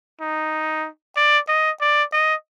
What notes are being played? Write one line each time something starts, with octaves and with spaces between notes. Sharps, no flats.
D#4
D5
D#5
D5
D#5